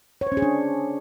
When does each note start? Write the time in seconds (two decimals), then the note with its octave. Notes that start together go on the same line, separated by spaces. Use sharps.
0.21 C#5
0.27 C5
0.32 C#4
0.37 G#4
0.42 D4